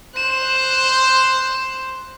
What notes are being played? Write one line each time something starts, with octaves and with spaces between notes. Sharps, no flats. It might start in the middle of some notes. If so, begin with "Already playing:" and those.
C5 F#6 E7